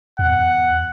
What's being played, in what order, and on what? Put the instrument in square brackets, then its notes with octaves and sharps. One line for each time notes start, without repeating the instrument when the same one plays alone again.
[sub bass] E2 [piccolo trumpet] F#5